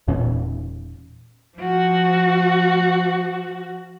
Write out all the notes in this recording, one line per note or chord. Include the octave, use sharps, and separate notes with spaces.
E1 E2 A#2 C#4
F3 F#4